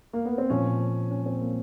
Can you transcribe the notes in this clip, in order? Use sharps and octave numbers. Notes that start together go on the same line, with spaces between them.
A#3
B3
C4
A#2 F3 C#4
C#4
C4
A#3